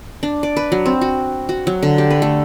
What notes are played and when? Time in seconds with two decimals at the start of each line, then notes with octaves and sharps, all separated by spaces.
0.23 D4
0.43 D5
0.57 B4
0.72 F#3
0.86 C4
1.01 F#4
1.49 F#4
1.67 F#3
1.83 D3
1.98 G4
2.10 B4
2.22 A3